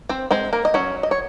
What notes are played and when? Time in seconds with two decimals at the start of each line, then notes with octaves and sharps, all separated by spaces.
0.09 C4 C5
0.31 G#3 C4 C5
0.53 A#3 A#4
0.65 D#5
0.74 F#3 C#4 C#5
1.03 D#5
1.11 C#5